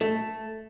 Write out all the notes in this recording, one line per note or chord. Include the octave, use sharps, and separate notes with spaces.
A3